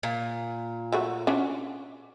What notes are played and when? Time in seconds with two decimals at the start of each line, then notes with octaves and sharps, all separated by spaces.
0.03 A#2
0.92 F#3 A3 F#4
1.27 C#4 D4 F#5